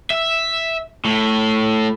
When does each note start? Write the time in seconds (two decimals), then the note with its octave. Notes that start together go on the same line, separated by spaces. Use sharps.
0.11 E5
1.05 A2